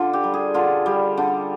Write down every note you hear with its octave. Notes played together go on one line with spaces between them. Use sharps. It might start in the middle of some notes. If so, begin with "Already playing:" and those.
Already playing: D3 F4
G4
G3
G#4
D3 F4
G3
D3